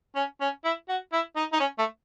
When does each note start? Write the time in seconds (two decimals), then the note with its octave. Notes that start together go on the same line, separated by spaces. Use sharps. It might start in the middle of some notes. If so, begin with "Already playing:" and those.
0.16 C#4
0.41 C#4
0.64 E4
0.89 F#4
1.12 E4
1.36 D#4
1.53 D#4
1.60 C#4
1.78 A3